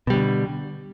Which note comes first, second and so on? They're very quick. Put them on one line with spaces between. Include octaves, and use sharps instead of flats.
B2 G3 D3